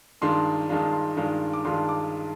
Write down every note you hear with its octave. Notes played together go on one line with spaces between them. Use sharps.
G2 D#3 G#3 D4 F4 C6
G2 D#3 G#3 D4 F4
C6
G2 D#3 G#3 D4 F4
D6
G2 D#3 G#3 D4 F4 C6
D6